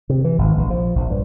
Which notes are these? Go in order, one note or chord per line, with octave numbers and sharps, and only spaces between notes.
C3
E3
G#1
A#1
F3
A#1
G2